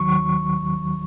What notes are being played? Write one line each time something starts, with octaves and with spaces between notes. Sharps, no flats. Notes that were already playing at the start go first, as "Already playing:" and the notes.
Already playing: D#2 D#3 F#3 C#6